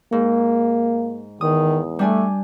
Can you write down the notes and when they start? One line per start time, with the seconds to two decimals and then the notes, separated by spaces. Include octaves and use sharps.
0.12 G#2 A#3
1.41 E2 D#3 D#6
1.99 G3 A3 D4 G#5